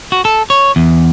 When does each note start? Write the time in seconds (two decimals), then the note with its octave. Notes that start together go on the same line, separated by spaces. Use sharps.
0.12 F#4
0.25 A4
0.50 C#5
0.76 E2